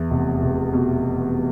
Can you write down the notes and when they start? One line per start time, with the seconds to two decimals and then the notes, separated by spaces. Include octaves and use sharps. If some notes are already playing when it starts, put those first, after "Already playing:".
Already playing: E2
0.11 F1
0.42 F1
0.73 B2